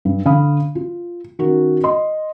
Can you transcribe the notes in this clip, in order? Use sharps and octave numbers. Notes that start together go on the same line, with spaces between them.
G2
D3 F5 B5 D#6
F4
D#3 C#4 F#4 A#4
D#5 C6